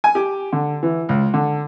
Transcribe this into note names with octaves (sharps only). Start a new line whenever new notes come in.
G#5
G4
D3
E3
C#2
D3